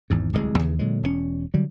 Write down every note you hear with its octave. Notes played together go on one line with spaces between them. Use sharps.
G#1 E2 G#2
D1 C2 C#3 G#3
D#2 C#3 E3
A#2 D3 F#3 G#3
E1 A#2 C#4
D3 F#3 G3